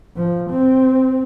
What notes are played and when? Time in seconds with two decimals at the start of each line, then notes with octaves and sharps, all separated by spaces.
0.16 F3
0.51 C4